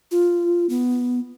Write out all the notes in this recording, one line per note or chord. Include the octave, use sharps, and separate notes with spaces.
F4
B3